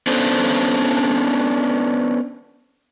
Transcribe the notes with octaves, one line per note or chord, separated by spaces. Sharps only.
B3 C#4 D4 A4 C5